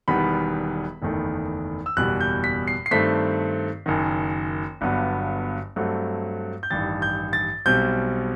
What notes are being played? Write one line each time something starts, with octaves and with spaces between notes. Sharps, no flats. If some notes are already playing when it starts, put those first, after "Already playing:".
E1 E2 D#3 G3 B3 B5
F#1 E2 D#3 A3
E6
F#1 E2 B2 G3 F#6
G6
B6
C7
C7
G2 D#3 A3 C4 B6
F#1 F#2 D#3
G1 G2 F#3 B3
G2 F#3 A3 C4
G6
A1 G2 D#3 A6
G6
A6
B1 B2 G3 C4 G6